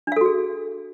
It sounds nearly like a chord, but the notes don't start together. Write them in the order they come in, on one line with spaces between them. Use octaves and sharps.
D4 F5 A4 F#4 G#4